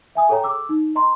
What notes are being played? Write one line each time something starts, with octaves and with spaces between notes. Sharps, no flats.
E5 G#5 D#6
G#4 A4 C#5 G5 A#5
D6 E6
D#4
D#5 A#5 C6